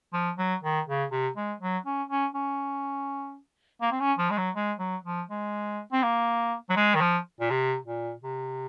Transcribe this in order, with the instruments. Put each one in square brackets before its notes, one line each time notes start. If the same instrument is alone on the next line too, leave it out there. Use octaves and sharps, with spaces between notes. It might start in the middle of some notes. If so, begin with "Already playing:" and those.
[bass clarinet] F3
F#3
D#3
C#3
C3
G#3
F#3
C#4
C#4
C#4
A#3
C4
C#4
F3
G#3
F#3
G#3
F#3
F3
G#3
C4
A#3
F#3
G#3
D#3
F3
A#2
C3
A#2
C3